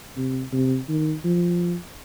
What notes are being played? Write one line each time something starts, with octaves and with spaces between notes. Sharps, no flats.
C3
C3
D#3
F3